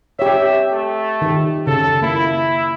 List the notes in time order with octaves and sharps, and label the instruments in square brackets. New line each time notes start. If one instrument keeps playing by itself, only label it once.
[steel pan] G4 C#5 [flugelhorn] E5
[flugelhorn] A3
[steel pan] D#3 G4
[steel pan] C#3 [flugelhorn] A4
[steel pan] A#3 [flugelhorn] E4